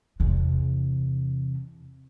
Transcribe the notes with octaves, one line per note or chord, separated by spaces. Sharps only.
E2 C3